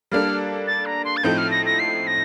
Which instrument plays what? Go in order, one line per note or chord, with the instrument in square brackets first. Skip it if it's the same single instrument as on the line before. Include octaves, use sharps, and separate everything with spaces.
[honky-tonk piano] G3 A#3 D4 A4 [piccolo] F6
[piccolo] A6
A#5
C6
A6
[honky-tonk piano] A2 F3 C4 D#4 A4 [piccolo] G6
[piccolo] F6
A#6
A#6
C7
A#6